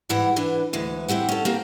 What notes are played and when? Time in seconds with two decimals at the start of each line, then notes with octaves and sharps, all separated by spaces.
0.09 G#2 E3 G3 E4 F#5
0.36 E3 D4 B4
0.73 D2 E3 G#3
1.08 C4 E4 G4 F#5
1.29 C#4 A4
1.45 A#3 C4 G4